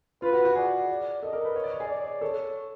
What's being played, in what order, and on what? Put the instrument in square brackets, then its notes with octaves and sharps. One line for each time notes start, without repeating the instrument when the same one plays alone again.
[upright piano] F4 [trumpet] B4
[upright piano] F#4
F#4
[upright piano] G#4 [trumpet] D5
[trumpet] D5
[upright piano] A4 [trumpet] D#5
[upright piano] A#4
B4
C#5
D5
C#5
G#4
[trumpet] D5
[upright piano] A4 [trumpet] C#5